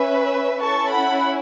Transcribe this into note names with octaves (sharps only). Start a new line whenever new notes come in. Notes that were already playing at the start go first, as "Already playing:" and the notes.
Already playing: C#4 B4 E5
C#4 E4 A4 A5 C#6
F#5 B5